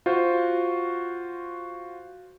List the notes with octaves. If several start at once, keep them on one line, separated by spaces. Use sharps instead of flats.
F4 F#4 C5